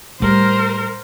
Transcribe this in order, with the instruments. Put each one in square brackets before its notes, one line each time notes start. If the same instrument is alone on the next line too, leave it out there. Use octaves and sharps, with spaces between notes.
[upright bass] A2 G3 [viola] A#4 C5